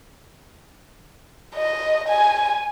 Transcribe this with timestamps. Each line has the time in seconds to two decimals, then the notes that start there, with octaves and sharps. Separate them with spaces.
1.56 D#5
2.08 G#5